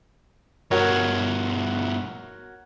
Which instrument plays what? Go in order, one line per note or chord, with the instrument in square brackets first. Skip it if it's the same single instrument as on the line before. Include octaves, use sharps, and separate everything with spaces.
[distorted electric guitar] G2 B2 [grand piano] F#4 A#4 C#5